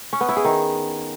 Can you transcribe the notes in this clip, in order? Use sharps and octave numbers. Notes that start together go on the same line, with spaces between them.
C#4
B3
E4
G#4
D#3